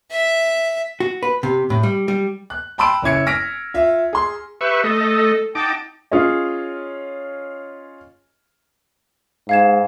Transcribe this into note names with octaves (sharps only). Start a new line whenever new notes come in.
E5
F#4
B4
C3
A2
G3
G3
F#6
G5 A5 B5 C6 E6 D7
F#1 C#4 E4 G#6 C#7
F6 A#6 B6 D7
F4 E5
G#4 C6
G4 B4 E5 C#6
A3 A4 D#5
D#4 F#5 G5 A5 D6
C#4 F4 G#4 C#5 D#5
G#2 F5 G#6 E7